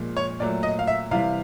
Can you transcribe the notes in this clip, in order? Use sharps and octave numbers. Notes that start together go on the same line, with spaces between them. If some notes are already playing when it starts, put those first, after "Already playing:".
Already playing: A#2 F3 G#3
C#5
A#2 F#3 A3 D5
D#5
F5
E5
C3 E3 G3 F5